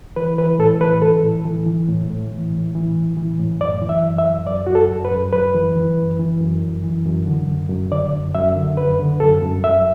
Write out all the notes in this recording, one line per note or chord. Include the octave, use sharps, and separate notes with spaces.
E3 B4
E3 B4
A2 A4
E3 B4
E3 A4
A2
E3
E3
A2
A2
E3
A2
E3
A2
E3
A2
F#2 D5
E3
E5
F#2
E5
F#2
F#2 D5
F#2 F#4
A4
F#2
B4
F#2
F#2 B4
E3
E3
F#2
E3
F#2
F#2
E3
F#2
D3
F#2
F#2
D3 D5
F#2
F#2 E5
D3
F#2 B4
D3
F#2 A4
F#2
F#2 E5